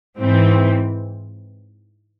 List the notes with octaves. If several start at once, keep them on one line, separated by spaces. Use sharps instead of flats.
G#2 E3 C4